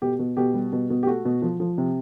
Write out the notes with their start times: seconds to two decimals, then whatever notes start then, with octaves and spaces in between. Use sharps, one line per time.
0.02 B2 G4
0.19 B2
0.37 B2 G4
0.54 G3
0.73 B2
0.90 B2
1.03 G4
1.07 A3 F#4
1.25 B2
1.42 F3
1.60 F3
1.78 C3